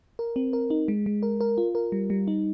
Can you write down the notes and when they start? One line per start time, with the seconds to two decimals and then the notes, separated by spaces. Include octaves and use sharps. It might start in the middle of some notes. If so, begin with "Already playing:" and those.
0.19 A#4
0.36 C4
0.53 A#4
0.70 D#4
0.88 G#3
1.06 G#3
1.23 A#4
1.41 A#4
1.58 F4
1.75 A#4
1.92 G3
2.10 G3
2.28 D#4